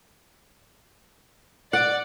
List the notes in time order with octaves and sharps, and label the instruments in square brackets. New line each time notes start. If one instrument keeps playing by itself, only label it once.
[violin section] D5 [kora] F#5